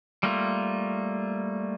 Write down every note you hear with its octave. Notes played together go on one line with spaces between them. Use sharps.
G3 A3 A#3 F4